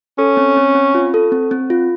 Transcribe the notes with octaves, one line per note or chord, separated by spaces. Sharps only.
C#4 A4
C4
C4
C4
F4
A4
C4
C4
F4